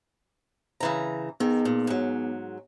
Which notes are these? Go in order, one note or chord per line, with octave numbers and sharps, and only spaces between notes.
C#3 E3 A#5
D#3 B3 D#4 G#4
A#2
G#2 F#3